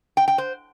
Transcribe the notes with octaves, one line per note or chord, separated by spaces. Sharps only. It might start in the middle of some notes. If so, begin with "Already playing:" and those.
G5
G5
C5